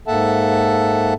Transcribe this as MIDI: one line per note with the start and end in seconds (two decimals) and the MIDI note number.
0.07 1.14 44
0.07 1.14 58
0.07 1.14 69
0.07 1.14 76
0.07 1.14 78
0.07 1.14 81